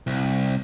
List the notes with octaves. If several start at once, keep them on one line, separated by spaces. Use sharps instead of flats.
C2